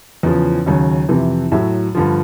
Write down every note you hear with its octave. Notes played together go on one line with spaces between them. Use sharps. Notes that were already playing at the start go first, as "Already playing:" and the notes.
E2 C#3 F3
D#2 C#3 F#3
F2 C3 E3
A2 F#3 E5
G2 D3 F3